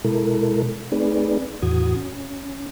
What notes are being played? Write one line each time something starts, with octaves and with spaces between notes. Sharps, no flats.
B2 G#3 E4 A4 A#4
A3 C4 D#4 G#4 B4 D5
E2 A2 E3 F#4 D#6 G#6
C#4